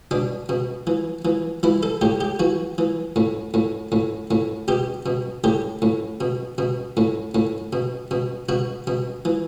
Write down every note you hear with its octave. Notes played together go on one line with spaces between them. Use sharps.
B2 D4
B2
E3
E3
E3 E4
A4
A2 G4
G4
E3 F#4
E3
A2
A2
A2
A2
B2 G4
B2
A2 G4
A2
B2
B2
A2
A2
B2
B2
B2 F#4
B2
E3